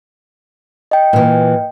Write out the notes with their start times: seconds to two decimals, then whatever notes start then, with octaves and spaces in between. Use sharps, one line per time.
0.91 D#5 G5
1.13 A#2 E3